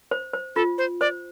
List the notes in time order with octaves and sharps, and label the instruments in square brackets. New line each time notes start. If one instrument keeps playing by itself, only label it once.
[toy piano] C5
C5
[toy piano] F4 [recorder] A4
[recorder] C5
[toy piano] C5 [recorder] D5